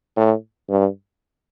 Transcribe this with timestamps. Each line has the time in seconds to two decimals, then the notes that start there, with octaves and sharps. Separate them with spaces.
0.16 A2
0.70 G2